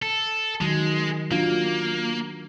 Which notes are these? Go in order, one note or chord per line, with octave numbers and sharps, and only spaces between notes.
A4
D#3 F#3 G#3
F#3 A#3 D4 F4